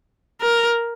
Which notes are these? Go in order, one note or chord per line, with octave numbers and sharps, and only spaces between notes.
A#4